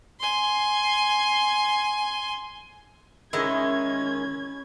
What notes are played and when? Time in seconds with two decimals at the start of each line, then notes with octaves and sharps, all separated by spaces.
0.20 G#5 C6
3.33 D#3 G#3 C#4 D#4 E4 G#6